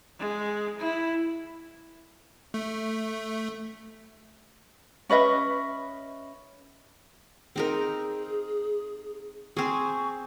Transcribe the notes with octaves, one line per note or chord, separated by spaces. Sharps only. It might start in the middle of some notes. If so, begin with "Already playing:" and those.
G#3
E4
A3
C#4 B4 D#5 E5
C4 D#4 G#4 A#4
C4 G#4 C#6